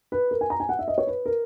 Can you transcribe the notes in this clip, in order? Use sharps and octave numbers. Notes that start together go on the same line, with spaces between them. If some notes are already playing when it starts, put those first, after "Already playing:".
B4
A#4
G#5
A#5
G#5
F#5
E5
D#5
C#5
B4
A#4